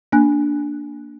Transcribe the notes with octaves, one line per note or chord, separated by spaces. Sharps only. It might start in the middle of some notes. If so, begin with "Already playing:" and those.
A#3 D4 G#5 F#6